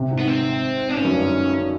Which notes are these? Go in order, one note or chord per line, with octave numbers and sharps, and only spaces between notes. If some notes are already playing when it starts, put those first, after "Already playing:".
Already playing: C3
G#2
B3
C4
D4
G2 C#4
F#2
G2